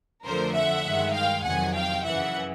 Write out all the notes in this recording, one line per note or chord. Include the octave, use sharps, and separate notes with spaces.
F2 D3 F3 A3 A#4 C5
E5 F#5
G2 D#3 G#3
F5 G5
F2 C3 D#3 F#3 F#5 G#5
F5 G5
F#2 C#3 E3 E5 F#5